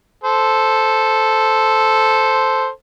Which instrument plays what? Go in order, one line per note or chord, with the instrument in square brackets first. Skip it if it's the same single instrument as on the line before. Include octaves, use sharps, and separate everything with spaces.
[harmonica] A4 C5